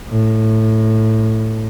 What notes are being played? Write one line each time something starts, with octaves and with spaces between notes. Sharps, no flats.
A2